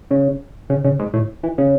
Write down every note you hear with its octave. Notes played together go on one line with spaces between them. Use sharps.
C#3
C#3
C#3
G#2
A2
E3
C#3